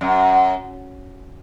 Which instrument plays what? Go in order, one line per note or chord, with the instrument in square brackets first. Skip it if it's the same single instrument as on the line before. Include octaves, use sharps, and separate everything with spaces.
[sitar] F#2